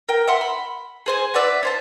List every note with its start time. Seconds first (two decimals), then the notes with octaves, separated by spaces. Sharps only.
0.09 A#4 G5
0.28 E5 F#5 C6
0.41 B5
1.06 G#4 C5 G#5
1.34 F#4 B4 D5 E5
1.63 C#4 C5 A5